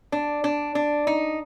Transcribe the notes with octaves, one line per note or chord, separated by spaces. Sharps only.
D4
D4
D4
D#4